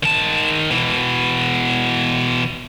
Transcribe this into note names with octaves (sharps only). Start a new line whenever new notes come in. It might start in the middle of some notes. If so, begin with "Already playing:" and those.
D#3 A5
B2 E3